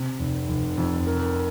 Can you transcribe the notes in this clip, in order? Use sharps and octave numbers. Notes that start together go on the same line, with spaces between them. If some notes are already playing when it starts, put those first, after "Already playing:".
Already playing: C3
F1
F1
F2
A#4